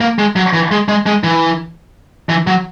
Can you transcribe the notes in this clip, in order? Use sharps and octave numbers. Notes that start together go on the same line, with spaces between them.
A#3
G#3
F#3
E3
G#3
G#3
G#3
E3
E3
F#3